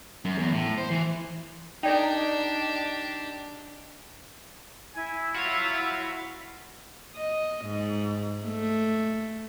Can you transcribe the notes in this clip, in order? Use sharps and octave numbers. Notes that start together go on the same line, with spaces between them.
F#2
E2
A2
C5
E3
D4 D#4 G4 A4 D5 G5
E4 G#5
F4 F#4 C#5
D#5
G#2
A3